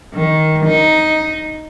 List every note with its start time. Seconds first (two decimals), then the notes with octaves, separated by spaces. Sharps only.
0.15 D#3
0.66 D#4